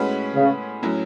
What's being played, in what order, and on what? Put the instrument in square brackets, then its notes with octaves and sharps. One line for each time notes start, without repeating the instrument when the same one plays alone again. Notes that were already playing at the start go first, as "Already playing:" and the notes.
Already playing: [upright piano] A2 G#3 C#4 F#4 B4
[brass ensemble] C#3
[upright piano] A2 F#3 C#4 E4